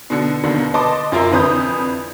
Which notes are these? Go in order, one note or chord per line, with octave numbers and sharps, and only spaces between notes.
B2 D3 C#7
D#2 B2 D3 D#3
B4 D#5 A5 C6 D6
F#2 F4 A#4 E5 C6
F2 D3 E3 B4 D#6 G6